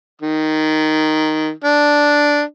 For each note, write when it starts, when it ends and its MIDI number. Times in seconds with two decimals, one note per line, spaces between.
0.21 1.50 51
1.64 2.42 62